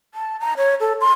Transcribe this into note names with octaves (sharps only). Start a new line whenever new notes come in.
A5
A#5
C#5
A4
C6